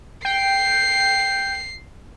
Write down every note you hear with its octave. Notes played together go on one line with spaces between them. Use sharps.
G5 C7